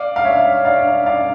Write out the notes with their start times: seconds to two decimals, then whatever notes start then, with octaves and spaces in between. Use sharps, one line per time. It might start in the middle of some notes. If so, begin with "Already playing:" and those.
Already playing: D5 F5
0.16 F5
0.24 C#5 E5
0.65 D5 F5
1.06 D5 F5